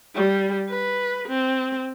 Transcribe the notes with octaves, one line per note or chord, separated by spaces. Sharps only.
G3
B4
C4